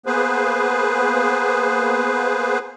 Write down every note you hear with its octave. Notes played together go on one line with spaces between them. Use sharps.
A#3 B3 G#4 B4 C5